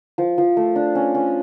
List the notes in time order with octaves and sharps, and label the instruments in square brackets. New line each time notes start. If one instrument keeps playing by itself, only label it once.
[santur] F3
F3
A3
D4
C#4
C#4